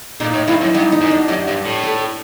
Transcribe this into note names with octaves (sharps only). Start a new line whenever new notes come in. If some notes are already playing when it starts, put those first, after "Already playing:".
A#2 D#4
A2
G2 E4
F#2
G2 D#4
D#4
F#2
D4
F#2 G4
G2
A2
A4